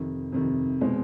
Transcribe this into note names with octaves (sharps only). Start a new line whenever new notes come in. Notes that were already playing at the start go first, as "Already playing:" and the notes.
Already playing: F2 C3 D#3
F2 C3 D#3
B2 G#3 C4